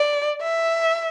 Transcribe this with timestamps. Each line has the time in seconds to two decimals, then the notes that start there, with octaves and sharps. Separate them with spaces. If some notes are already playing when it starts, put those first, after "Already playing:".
Already playing: D5
0.42 E5